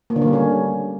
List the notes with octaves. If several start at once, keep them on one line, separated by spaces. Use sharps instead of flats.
A#3
D3
A#3
G3
C#4